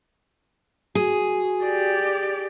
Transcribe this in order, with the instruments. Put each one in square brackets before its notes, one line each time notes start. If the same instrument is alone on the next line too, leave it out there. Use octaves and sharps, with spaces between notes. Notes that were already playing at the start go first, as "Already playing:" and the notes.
[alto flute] F#4 [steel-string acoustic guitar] G#4
[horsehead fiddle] G4 D5